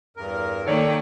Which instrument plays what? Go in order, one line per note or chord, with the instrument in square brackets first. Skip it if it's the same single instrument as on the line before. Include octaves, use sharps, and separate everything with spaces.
[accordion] E2 G2 A#4
[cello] D#3 A#3 [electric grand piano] A4 C#5 D5 [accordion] G5